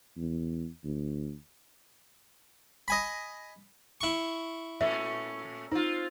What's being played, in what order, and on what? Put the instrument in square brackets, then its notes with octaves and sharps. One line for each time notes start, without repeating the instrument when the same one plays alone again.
[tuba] E2
D2
[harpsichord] D#5 G#5 B5
E4 C#6
[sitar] A#2 A3 C#4 [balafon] E5
[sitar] C4 F4 [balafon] D#4